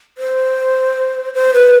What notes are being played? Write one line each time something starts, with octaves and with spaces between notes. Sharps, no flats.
C5
C5
B4